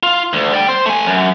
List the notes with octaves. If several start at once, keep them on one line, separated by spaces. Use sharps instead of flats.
F4
D2
D5 G5
C5
A3 G#5
F#2